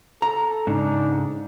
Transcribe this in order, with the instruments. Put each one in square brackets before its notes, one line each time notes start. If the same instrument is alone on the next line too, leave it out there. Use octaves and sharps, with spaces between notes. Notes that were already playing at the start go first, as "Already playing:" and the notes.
[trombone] A4 [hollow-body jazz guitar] A#5
[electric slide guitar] G#2 C#3 [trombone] D4 [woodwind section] D#4